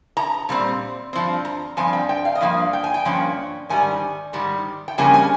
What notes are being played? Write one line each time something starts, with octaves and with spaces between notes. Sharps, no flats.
A#5
A#2 G3 C4
G2 F3 C4
A#5
G2 F3 C4 G#5
G5
G5
F5
D#5
G2 F3 A#3 F5
G5
G#5
G5
G2 F3 A#3 C#4
G#2 D#3 G3 G#5
G#2 D#3 G3
G5
F2 C#3 G3 A#3 C#4 G#5
G#5